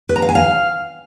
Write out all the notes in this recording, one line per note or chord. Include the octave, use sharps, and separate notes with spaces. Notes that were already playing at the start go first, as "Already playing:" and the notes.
B4
A#5
F5
G#5
F5